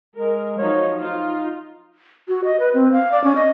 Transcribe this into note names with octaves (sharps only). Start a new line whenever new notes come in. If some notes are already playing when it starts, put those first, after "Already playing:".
G#3 A#4
F3 F#3 D#4 C#5
D#4 F4
F#4
D#5
B4
C4
F5
D5
C#4
D#5